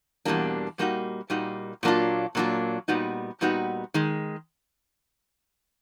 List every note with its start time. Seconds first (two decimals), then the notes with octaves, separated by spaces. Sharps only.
0.25 E2 B2 G3 A#3 D4
0.78 A#2 G3 A#3 D#4 F#4
1.30 A#2 G3 A#3 D#4 F#4
1.83 A#2 F#3 A#3 D4 F4
2.35 A#2 F#3 A#3 D4 F4
2.88 A#2 G3 B3 D#4 F#4
3.41 A#2 G3 B3 D#4 F#4
3.94 D#3 G#3